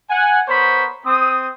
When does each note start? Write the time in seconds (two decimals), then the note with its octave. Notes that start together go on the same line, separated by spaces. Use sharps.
0.10 F#5 G#5
0.48 B3 A#4 C5 C#5 B5
1.06 C4 D#6